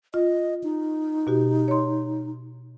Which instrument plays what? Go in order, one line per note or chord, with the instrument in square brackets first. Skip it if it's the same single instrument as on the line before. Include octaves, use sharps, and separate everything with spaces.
[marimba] F4 [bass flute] D#5
[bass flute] D#4
[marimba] B2 F#4 G4
C#5 C6